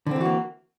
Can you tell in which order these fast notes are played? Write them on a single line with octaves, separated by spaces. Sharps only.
D3 C4 E3 F#4 A#3